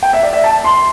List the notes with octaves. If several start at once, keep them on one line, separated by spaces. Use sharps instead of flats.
G5
E5
D5
E5
A5
C6